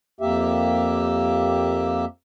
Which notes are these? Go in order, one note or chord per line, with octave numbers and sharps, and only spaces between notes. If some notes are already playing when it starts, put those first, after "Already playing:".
F2 A#3 G4 E5